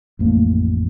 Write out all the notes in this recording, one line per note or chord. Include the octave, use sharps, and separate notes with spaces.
A1 F2 A3 A#3